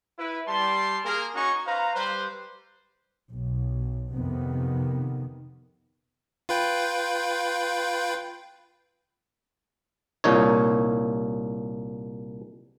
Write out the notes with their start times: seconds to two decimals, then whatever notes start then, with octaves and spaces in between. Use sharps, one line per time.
0.19 E4 B4
0.48 G3 A5 C6
1.05 A#3 G#4 A#4
1.35 C#4 D#4 F#4 D#5 G#5 C#6
1.67 B4 C5 F5 A#5
1.95 G3 B4 C5
3.31 B1
4.12 F2 C3 D#3 B3
6.49 F4 B4 G5
10.24 C2 A#2 D#4 C#5